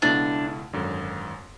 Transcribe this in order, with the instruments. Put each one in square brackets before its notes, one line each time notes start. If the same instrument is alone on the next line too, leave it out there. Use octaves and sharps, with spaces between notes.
[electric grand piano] C#2 B2 A3 E4 [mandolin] D4
[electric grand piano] G#1 F#2 D3